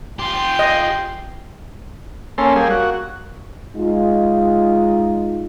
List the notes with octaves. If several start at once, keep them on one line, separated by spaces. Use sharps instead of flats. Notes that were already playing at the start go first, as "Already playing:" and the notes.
F4 G4 G5 C6
D#5
A#3 C#4 A4 C6
G3 A#3 G#4
F#4
G#3 D#4 F4